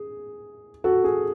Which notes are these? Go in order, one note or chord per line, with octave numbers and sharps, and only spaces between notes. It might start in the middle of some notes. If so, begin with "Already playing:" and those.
Already playing: G#4
F#4 A4
G#4